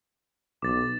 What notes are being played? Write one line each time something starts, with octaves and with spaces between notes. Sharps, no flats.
B1 D6 A6